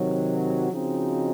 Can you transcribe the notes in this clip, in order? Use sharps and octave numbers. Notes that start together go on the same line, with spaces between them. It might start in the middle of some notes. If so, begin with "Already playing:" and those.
Already playing: C3 D#3 F#3
C#3 F3 C4 D#4 F#4